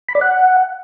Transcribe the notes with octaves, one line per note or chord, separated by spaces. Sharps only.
B5
D5
F#5